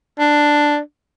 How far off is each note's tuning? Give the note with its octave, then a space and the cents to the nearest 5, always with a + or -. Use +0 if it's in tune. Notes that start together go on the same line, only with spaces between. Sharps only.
D4 +5